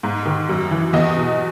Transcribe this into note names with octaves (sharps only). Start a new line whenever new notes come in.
G#2
D#3
F#2
E3
E2 D#5
B2